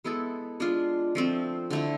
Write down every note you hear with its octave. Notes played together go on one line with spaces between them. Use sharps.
G#3 B3 E4 A4
G#3 D4 F4
F3 A3 C4
D3 A3 E4